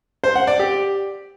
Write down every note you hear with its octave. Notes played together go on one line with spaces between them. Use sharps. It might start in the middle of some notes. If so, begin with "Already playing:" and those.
C5
F#5
D5
G4